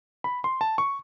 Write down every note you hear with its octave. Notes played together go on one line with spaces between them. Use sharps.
B5
C6
A5
C#6